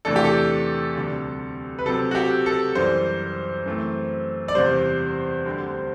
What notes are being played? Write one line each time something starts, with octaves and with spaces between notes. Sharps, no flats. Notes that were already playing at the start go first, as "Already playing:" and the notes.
E2 C3 E3 A3 D4 A4
G4
A4
D2 C3 G3
B4
C3 F#3 C4 A4
F#4
G4
A4
F#2 E3 G3 C5
F#2 E3 A3 C4
D5
E2 C3 G3 C5
D2 D3 G3 C4